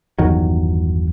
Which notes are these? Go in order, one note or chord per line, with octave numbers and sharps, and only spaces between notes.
G1 E2 D#3 F#3